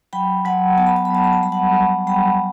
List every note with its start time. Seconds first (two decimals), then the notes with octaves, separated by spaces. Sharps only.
0.13 F#3 G5 B5
0.45 F#3 F#5 A5
0.78 B3 A5
0.87 B5
0.96 A5
1.05 B5
1.10 F#3 A5
1.24 B5
1.33 A5
1.42 G3 B5
1.52 F#5 A5
1.75 G3
2.07 G3 G5 B5